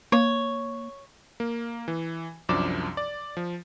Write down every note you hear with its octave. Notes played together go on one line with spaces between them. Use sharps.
A#3 C#5
A#3
E3
C2 F#2 F3 D4 D6 E7
D5
F3